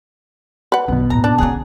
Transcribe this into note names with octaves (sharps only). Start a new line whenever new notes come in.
B4 F#5
B1 B2 D#3 B3
D#2 A2 A#5
D4
D3 F#3 C#4 G#4